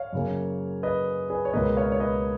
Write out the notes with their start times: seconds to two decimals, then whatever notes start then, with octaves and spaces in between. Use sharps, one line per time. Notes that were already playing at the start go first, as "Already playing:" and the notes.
Already playing: C#5 F5
0.13 F#2 C#3 F#3 A#3
0.83 B4 D#5
1.30 G#4 B4
1.45 C#5
1.53 C#2 B2 A#3 B4 D#5
1.77 C#5 F5
1.92 C#5
2.00 B4 D#5